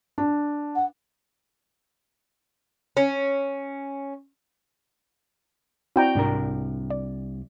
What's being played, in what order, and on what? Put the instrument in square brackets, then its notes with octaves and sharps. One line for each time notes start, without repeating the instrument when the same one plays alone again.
[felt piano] D4
[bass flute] F#5
[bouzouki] C#4
[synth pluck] C4 E4 D5 [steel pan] F#4 G5 A#5
[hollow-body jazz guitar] C2 D4 A#4 [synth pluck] G#2
[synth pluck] D5